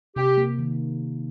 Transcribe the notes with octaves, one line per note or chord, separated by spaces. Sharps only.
C3 G4
A#3
D#3